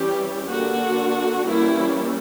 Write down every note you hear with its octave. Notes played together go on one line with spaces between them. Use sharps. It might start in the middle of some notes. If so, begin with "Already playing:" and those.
Already playing: E3 G3 C#4 G4
D3 A#3 D4 F#4
E3 G3 A#3 C#4 E4